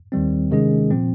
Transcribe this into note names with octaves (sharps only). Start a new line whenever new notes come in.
D#2 D#3 G3 C4
C3 D#3 G#3 C#4 G#4
A#2 F3 C4